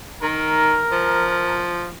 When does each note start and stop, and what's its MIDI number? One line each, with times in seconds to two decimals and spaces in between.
0.22 0.83 51
0.22 1.62 70
0.92 1.90 53